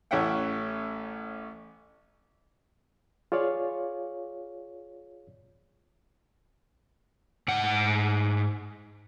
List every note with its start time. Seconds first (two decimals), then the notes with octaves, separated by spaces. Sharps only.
0.11 A1 C#4 E4 E5 F#5 G5
3.32 F4 G#4 C#5 D5 F5
7.48 G#2 F#5